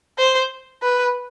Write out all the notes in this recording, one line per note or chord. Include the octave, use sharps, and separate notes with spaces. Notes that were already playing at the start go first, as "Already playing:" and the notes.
C5
B4